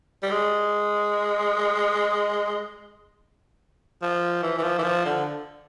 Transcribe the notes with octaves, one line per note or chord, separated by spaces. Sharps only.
G3
G#3
F3
E3
E3
F3
E3
F3
D3